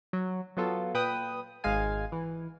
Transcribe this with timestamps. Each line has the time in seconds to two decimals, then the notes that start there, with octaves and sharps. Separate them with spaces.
0.13 F#3
0.57 F#3 B3 F4 A4
0.94 A#2 B4 G5 D#6
1.64 G#1 G#3 F5 G#5
2.12 E3